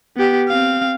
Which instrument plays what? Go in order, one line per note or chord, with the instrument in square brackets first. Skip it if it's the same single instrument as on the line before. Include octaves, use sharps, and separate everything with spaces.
[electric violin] B3 G4
C4 F5